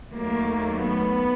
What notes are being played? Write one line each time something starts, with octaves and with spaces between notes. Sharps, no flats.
D#2 D#3 F#3 A3 A#3
B3